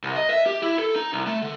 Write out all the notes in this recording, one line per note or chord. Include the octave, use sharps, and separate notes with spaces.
C2
D#5
E5
G4
E4
A4
D#4
C2
A3
D3